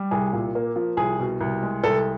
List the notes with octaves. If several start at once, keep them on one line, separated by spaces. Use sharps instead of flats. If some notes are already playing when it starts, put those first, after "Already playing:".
Already playing: G3
C2 G#4
A#2
A#3
F3
C2 G#4
B2
C2
G#3
C2 A4